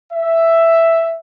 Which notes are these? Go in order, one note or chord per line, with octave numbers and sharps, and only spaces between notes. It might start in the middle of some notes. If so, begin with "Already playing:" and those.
E5